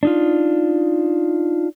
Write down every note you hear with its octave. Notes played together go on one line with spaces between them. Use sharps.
D4 D#4 F4